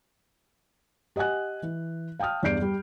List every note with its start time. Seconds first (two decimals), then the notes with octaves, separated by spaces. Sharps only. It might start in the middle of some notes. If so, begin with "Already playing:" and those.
1.16 G4 D#5 F#5 G#5 F#6
1.63 E3
2.19 F5 G5 A5 D#6 F6
2.43 E2 G2 D5 G6 C7 D7
2.62 G3